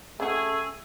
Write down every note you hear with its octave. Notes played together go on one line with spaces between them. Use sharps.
C#3 A3 C#4 F#4 G#4 G5 E6